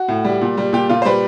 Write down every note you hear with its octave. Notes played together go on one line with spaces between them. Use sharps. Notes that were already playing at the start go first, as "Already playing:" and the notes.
Already playing: F#4
A2
G3
A#2
G3
A#2 G4
A#2 F4
C5
G3 B4